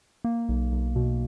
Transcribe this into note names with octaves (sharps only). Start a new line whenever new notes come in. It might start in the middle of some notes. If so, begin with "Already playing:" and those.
A#3
B1
B1
B2